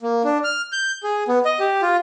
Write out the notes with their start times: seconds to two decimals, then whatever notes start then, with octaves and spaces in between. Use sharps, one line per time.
0.02 A#3
0.24 D4
0.44 F6
0.72 G6
1.03 G#4
1.28 B3
1.45 D#5
1.60 G4
1.82 F4